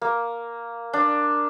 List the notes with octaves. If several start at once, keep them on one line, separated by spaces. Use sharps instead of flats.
A#3
D4